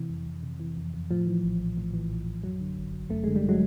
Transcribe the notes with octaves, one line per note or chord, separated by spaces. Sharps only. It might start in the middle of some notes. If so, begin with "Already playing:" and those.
Already playing: C3 E3
F2
F2
C3
E3
F2
F2
A2 F3
E3
A#1
A#1
A2
E3
A#1
A#1
F#2 F#3
D3
G1
G1
F#2 A3
D3 G#3
G3
F#3 G#3